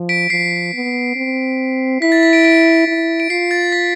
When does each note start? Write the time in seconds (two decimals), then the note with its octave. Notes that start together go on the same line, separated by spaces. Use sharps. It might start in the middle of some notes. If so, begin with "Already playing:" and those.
Already playing: F3
0.09 B6 D7
0.30 F3 C7
0.74 B3
1.16 C4
2.01 E4 B6
2.12 A6
2.23 B6
2.33 B6 D7
2.45 B6 D7
2.87 E4
3.20 D7
3.30 F4 C7
3.51 A6
3.72 B6